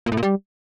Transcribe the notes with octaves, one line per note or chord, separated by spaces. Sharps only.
A#2
A2
A#2
G3